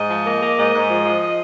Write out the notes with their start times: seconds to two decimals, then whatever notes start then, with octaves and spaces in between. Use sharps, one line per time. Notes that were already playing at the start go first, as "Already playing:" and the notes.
Already playing: G#2 D#5
0.10 F3
0.25 A#3
0.41 A#3
0.57 G#2 D#5
0.73 G#2
0.90 F3
1.05 F3